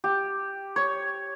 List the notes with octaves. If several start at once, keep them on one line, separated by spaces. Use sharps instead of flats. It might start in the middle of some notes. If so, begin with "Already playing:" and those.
G4
C#5